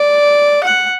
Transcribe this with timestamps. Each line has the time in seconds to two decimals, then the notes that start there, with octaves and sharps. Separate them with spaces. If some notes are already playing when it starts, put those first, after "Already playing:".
Already playing: D5
0.64 F#5